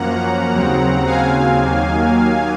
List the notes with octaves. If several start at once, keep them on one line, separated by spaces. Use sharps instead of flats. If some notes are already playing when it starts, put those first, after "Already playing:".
Already playing: F#2 F3 A#3 C#4 F#5 A#5
D#2 C#3 F#3 C4
F5 G#5
D#2 D#3 F#3 A#3